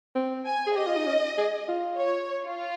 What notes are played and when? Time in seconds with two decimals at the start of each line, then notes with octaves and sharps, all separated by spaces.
0.15 C4
0.45 G#5
0.67 G#4
0.76 G4 D#5
0.87 F4
0.97 D#4
1.07 C#4
1.38 G#4
1.68 F4
1.99 C#5
2.44 F4